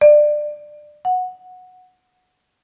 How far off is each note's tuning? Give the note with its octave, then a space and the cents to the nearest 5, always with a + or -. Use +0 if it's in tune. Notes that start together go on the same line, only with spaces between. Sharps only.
D5 +20
F#5 -10